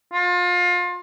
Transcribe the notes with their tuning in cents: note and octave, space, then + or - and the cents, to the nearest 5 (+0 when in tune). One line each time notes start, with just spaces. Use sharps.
F4 +30